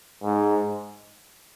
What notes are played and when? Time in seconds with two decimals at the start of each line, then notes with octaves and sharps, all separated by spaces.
0.24 G#2